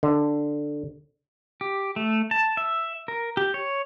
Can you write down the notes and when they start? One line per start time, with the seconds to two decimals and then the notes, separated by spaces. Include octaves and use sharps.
0.03 D3
1.61 G4
1.96 A3
2.31 A5
2.57 E5
3.08 A#4
3.37 G4
3.54 C#5